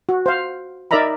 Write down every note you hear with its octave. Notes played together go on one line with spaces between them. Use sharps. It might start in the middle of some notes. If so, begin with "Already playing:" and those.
F#4
C5 F5
D#4 A#4 D5 E5 A#5 B5